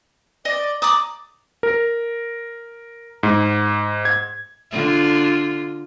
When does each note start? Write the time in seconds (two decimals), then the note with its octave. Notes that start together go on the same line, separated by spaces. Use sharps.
0.45 D5 D#5
0.82 D5 A#5 D6 D#6
1.63 A#4
3.23 G#2
4.05 G#6
4.71 D3 F4